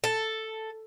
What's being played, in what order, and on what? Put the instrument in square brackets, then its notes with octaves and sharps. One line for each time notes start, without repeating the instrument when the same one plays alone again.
[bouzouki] A4